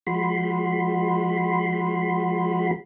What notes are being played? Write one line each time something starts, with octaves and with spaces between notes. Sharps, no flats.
F3 G#3 F#4 B5 C6